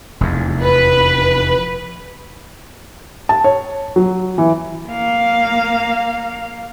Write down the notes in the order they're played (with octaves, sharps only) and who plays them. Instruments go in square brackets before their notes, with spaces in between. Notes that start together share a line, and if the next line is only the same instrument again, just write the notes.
[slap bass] F1 E2
[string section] B4
[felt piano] A5
C#5
F#3
E3
[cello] A#3 F5